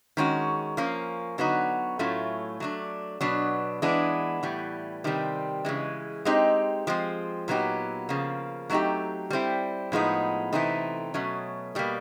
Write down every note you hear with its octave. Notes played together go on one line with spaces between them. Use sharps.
D#3 G#3 C#4 F#4
F3 A#3 C#4
D3 F#3 B3 D#4 F#4
A2 F#3 A3 C#4 F4
F#3 A3 D4
B2 F#3 B3 D4
E3 G#3 B3 D4
A2 E3 G3
C3 D#3 G3 C4
C#3 E3 G#3
G#3 C4 D#4 G4
F3 G#3 C4
A#2 F#3 B3 D#4 G4
C#3 F3 A#3
F#3 A3 C4 D#4 G4
G3 C4 E4
A2 F3 G#3 B3 D#4
C3 E3 A3 C4 D#4
B2 F#3 A3 C#4
B2 G3 A#3